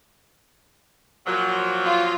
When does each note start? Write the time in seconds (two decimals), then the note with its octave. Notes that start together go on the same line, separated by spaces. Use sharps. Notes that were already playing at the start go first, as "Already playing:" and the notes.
1.27 A#2 F3 F#3
1.85 F4